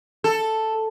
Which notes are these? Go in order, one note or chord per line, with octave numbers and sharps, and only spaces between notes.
A4